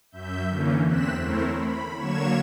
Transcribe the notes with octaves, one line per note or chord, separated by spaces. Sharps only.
F#2 E5 G6
D3 E3 A#3 C#4
E2 C4 F#6 B6 E7
A3 C4 E4 A#4 C5 C#5
B5
D3 F#3 A#3 C#5 G#6 E7